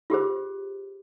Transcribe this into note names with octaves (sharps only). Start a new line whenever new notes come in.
F4 G4 G#4 C5